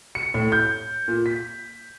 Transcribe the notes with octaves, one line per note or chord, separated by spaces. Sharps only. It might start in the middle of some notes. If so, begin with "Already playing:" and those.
C#7
A2
G6
A#2
B6